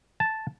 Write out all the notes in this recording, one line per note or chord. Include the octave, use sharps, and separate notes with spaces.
A5